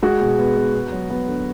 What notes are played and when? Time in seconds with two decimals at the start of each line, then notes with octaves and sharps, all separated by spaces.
0.03 G#3 F#4
0.21 B2
0.38 B3
0.56 B3
0.74 B3
0.92 F#3
1.10 B3
1.27 D3